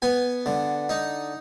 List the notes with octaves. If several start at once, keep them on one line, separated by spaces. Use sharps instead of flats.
B3 G#5
D3
D#4